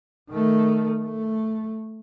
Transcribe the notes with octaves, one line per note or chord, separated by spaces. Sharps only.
D#3 A3
A3